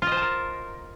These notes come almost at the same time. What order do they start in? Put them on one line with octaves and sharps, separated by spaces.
F4 D#5 C5 A5 A#4